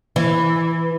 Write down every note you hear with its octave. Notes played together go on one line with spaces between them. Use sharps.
E3